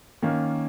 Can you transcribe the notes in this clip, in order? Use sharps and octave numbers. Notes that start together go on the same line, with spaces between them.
D#3 A#3 C#4